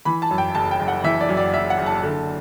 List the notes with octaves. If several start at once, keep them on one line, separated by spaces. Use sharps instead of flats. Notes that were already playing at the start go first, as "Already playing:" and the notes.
E3 B5
A5
F#2
G5
F#1 A5
G5
F#1
F#5
E3 E5
D5
F#2
D5
F#1 E5
F#5
F#1
A5
D3